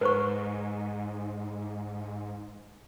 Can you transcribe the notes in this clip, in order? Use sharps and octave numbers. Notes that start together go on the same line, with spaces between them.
G#2 B4 C5 C#6